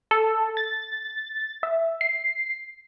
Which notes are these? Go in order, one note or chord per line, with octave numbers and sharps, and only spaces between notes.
A4
A6
E5
C7